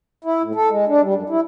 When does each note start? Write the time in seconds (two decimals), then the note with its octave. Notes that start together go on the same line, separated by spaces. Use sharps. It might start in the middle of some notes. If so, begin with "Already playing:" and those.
0.24 E4
0.42 A2
0.55 A4
0.70 G#3
0.88 D4
1.02 G3
1.14 F#2
1.30 E4